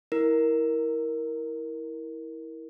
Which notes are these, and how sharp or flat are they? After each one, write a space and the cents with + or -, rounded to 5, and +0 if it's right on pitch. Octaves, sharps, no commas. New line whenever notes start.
E4 -20 A#4 +5